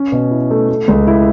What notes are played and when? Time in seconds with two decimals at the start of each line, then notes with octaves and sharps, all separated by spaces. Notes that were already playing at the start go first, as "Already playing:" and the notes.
Already playing: C#4
0.12 B2
0.31 E4
0.50 A3
0.69 A3
0.88 C#2
1.07 E4